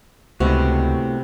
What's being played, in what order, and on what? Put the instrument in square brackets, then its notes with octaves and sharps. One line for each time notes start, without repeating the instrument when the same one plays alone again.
[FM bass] C#2 [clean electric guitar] A2 B3 F#4 [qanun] C3